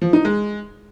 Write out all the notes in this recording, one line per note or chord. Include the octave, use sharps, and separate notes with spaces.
F3
D#4
G#3